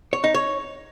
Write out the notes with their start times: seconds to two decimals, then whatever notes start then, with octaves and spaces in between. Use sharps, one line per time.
0.13 C#5
0.24 D#4
0.35 C#5